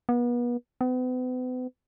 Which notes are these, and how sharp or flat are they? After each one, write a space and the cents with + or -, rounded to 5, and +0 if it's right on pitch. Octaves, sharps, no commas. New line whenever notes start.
B3 -35
B3 +40